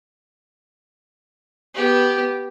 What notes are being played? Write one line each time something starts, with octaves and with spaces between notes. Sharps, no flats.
B3 G4